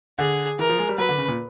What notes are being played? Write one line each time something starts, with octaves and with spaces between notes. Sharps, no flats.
D3 G#4
E3 A#4
F3
G#3
G3
F#3 B4
D3
C#3
A#2